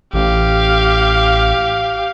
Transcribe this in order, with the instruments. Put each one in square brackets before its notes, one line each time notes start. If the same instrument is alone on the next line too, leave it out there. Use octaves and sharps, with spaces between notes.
[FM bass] A1 [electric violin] G4 F5